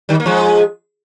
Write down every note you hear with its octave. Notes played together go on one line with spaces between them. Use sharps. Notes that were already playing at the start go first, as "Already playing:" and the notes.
D#3 G3
A#3
F3 G#3